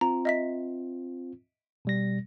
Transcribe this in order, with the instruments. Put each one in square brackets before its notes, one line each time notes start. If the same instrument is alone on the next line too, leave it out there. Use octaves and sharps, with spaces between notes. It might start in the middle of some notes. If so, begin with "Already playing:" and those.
[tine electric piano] C4 F4 [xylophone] A#5
[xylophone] D#5 E5 B6
[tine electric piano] B2 G3 A#6